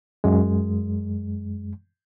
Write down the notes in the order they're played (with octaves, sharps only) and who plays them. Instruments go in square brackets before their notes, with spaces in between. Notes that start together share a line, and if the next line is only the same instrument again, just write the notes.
[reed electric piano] F#2 G#3